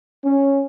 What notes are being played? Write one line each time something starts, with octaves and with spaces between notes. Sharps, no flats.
C#4